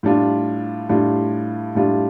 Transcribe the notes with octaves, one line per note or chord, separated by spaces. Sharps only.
A2 G3 D4 F4
A2 G3 D4 F4
A2 G3 D4 F4